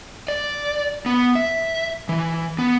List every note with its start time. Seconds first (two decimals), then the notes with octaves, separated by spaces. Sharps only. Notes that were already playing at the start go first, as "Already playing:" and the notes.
0.28 D5
1.06 B3
1.35 E5
2.09 E3
2.59 B3